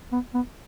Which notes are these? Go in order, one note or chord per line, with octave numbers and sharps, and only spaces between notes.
B3
B3